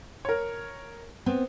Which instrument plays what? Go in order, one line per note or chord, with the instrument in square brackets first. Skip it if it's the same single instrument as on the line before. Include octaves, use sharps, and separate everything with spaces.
[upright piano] A#4 C#5
[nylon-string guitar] B3 C4